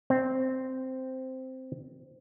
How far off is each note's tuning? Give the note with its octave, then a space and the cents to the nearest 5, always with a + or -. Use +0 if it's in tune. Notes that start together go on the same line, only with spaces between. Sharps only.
C4 -5